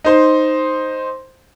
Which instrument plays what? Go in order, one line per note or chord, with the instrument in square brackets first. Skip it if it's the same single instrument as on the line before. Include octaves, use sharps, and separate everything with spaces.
[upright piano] D#4 C5 C6